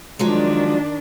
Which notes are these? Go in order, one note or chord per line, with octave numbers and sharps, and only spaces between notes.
D#3 F3 F#3 G#3 D4